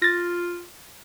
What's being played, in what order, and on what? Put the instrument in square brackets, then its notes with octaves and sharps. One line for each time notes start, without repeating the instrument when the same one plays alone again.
[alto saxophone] F4 [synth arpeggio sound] A6 A#6